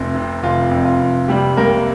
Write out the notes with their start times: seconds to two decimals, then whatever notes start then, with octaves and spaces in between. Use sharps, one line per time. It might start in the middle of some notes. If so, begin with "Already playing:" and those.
Already playing: F1 F2
0.15 C3
0.43 F1 F4
0.71 F2
0.85 F4
1.00 F1
1.28 C3 G3 G4
1.57 C2 A#3 A#4